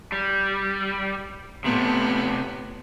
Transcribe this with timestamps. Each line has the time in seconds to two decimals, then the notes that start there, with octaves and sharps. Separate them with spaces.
0.12 G3
1.64 A2 C3 A3 B3